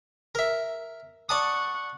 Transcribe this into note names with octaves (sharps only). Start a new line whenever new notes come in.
A#4 E5
D5 F#5 A5 C#6 D#6